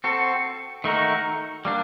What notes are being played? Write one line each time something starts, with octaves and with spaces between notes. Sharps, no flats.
C4 F#4 A4
D#3 A3 D#4 F#4 A#4
G3 A#3 D4